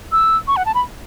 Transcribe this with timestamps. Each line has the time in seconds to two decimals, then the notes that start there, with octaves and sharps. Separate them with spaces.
0.12 E6
0.48 C#6
0.57 F#5
0.66 A5
0.74 B5